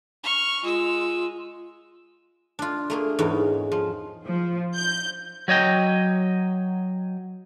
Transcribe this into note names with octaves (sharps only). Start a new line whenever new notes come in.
C#6 F6
G#3 F4 E6
D4 F4
A3 A#3 G#4
E2 G#2 C#4 D#4
F3
F3
G6
F#3 C#5 D#5 G5